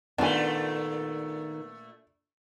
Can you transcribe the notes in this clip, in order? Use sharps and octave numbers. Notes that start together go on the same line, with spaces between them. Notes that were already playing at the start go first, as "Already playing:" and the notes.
A#2 D#3 A3 B3 D4 F4 G#5